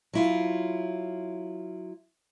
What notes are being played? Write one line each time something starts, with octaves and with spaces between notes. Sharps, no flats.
F#3 E4 F4